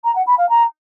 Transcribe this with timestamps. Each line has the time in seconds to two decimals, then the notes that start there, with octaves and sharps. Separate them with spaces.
0.04 A#5
0.15 F#5
0.27 B5
0.38 F5
0.49 A#5